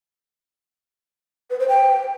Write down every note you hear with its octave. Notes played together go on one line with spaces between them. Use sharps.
B4
C5
G5